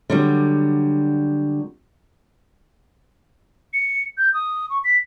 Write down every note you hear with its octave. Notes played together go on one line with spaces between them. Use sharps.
D3 F#3 G3
C#7
G6
D#6
C#6
B6